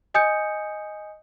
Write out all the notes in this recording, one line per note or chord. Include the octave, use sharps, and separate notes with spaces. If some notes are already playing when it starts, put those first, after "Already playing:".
D#5 G#5 D#6 G6 C#7